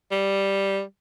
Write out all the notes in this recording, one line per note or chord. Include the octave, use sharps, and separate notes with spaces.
G3